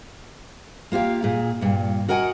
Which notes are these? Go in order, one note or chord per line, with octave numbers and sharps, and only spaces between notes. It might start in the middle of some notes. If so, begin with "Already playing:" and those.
A#3 F4 G4 F5
A#2 G#4
G2 A#2
F#4 A#4 D#5 F#5 G#5